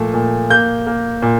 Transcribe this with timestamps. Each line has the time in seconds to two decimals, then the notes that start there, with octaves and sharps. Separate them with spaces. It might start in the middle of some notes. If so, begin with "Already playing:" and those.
Already playing: A#2 F3 A3
0.14 A#2
0.50 A#3 G6
0.86 A#3
1.22 A#2